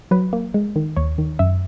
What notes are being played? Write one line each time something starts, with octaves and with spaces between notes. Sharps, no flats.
F#3 B4
A#3
G#3
D#3
D#2 C#5
D#3
F#2 E5